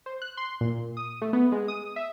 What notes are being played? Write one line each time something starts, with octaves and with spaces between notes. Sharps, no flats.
C5
F#6
C6
A#2
D#6
A3
B3
G#3
D#6
E5